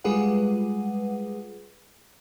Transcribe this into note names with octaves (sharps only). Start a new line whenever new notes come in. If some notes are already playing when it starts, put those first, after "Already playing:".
G3 G#3 F4 G#4 B4 F#5